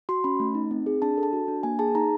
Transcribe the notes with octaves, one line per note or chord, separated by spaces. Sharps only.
F#4 C6
C#4 B5
A3
D#4
C4
G#4
D4 A5
A4
A5
F#4
D4
A#3 G#5
G#4 A5
D#4 A#5